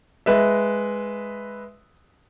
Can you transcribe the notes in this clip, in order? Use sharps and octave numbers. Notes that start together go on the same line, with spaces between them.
G#3 B4 D#5 E5